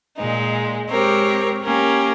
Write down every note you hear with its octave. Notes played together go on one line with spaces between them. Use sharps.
A#2 G#3 D#4
G#3 C4 G4 A#4 C#5
A#3 C#4 G4 A#4